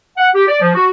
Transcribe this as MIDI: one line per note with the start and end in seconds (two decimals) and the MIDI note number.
0.18 0.28 78
0.35 0.47 67
0.48 0.58 74
0.61 0.72 53
0.75 0.88 66